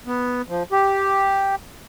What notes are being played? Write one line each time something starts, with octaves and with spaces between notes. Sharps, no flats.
B3
F3
G4